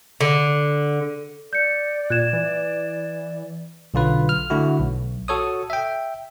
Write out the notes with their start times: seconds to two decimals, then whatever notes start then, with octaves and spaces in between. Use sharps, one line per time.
0.21 D3
1.53 D5 G6 C#7
2.10 A#2 F#6 G#6 E7
2.33 E3
3.94 B1 D3 F4 B4
4.29 F6
4.50 D3 A3 E4 F#4
4.79 B1
5.28 F#4 A4 C#5 D#6
5.70 E5 G5